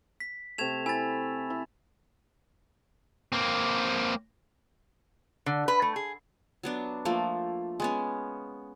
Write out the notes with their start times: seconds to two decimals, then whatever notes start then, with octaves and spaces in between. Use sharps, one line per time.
0.20 B6
0.58 C3 A3 G#6 E7 F7
0.86 E4 G#5 A6
1.50 E4
3.32 A#3 C4
5.46 D3
5.68 B4
5.82 A3
5.96 G#4
6.63 F#3 B3 D4
7.05 F3 A3 A#3
7.80 G#3 B3 C#4